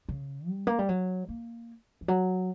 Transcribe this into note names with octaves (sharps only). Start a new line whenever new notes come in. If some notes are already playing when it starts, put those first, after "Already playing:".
C#3
G3
A#3
G3
F#3
A#3
E3
F#3